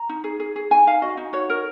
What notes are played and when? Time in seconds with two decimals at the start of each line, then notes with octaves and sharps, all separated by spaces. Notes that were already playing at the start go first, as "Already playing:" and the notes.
Already playing: A#5
0.09 D#4
0.24 G#4
0.40 G#4
0.56 G#4
0.71 D#4 G#5
0.87 D#4 F5
1.02 F#4 D#5
1.17 D#4
1.33 F#4 C#5
1.49 A#4